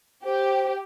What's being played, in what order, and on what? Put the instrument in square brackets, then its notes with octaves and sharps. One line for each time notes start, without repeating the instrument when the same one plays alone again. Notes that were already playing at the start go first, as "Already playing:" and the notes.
[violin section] G4 [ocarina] C5